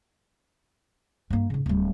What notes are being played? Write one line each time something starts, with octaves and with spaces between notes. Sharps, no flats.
G2 A#3
G#2 C#3
D1 G3